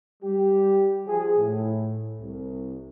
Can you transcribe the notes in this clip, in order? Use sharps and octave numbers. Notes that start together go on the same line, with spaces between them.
G3 G4
F3 G#4
A2
C2